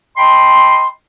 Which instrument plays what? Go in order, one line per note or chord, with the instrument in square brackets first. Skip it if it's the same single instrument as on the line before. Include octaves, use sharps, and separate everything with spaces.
[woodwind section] D#5 G5 A5 B5 C6